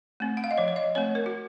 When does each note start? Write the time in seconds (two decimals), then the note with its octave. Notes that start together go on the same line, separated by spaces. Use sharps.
0.20 A3 C4
0.37 F#5
0.44 F5
0.51 D#5
0.58 F3 C#5
0.68 C#5
0.76 D#5
0.95 A3 C4 C#5
1.15 A#4
1.26 F#4